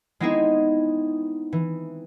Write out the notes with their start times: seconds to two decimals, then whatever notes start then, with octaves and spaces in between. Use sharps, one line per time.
0.20 G#3 B3 C4 D#4 E4 G#4
1.53 E3